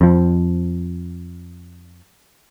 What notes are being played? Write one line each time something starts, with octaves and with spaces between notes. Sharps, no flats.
F2 F3